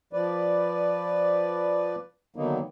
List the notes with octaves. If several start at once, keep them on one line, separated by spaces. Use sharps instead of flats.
F3 B4 D5
D3 D#3 F#3 A#3 B3 D#4